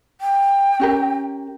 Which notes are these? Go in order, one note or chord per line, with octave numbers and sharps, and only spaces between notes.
G5
C#4 G4 A#4